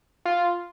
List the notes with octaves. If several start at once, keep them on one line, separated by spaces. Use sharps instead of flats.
F4